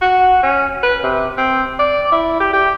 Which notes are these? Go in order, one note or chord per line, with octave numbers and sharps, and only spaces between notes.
F#4
C#4
B4
C3
C4
D5
E4
G4
G4